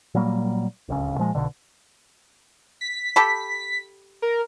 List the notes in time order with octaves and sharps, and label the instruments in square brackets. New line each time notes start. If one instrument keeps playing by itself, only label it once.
[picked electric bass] A#2 F#3 G3 A#3
D1 C#2 C#3
A#2 F3 G#3
B1 B2 D3
[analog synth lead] B6
[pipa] G4 A4 B5
[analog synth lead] A#4